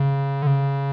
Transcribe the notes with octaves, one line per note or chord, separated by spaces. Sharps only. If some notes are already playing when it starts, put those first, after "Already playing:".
Already playing: C#3
D3
C#3